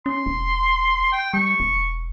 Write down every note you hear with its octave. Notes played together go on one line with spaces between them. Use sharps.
C#4 C6
E1
G5
G3 C#6
E1